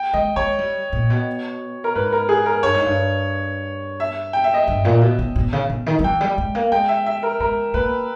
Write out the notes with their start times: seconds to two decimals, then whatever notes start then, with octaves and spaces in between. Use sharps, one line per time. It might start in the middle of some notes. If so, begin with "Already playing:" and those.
Already playing: G5
0.13 G#3 D#5
0.36 G#3 C#5
0.59 G3
0.93 A#2
1.10 B2
1.84 A#4
1.95 G#2 B4
2.13 A#4
2.29 G#4
2.46 A#4
2.63 G2 C#5
2.74 G#2
2.86 G2
4.00 E5
4.33 G5
4.44 E5
4.54 D#5
4.63 G2 E5
4.85 A#2
5.01 B2
5.19 B2
5.36 B2
5.53 C#3
5.70 B2
5.86 D#3
5.99 G3
6.04 E3 G5
6.21 G3
6.38 G#3
6.55 A#3
6.72 G#3 G5
6.88 E5
7.06 E5
7.23 A#4
7.40 G#3 A#4
7.74 A#3 B4